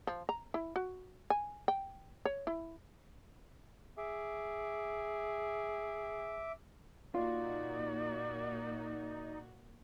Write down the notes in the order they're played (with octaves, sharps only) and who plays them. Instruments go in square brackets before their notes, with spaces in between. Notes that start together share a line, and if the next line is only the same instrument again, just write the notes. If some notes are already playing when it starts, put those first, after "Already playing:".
[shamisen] F3
A#5
E4
F#4
G#5
G5
C#5
E4
[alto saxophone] G#4 [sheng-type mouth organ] E5 D6
[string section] A#2 A#3 F#4 [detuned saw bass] D#4 [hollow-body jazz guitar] F4 [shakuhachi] D5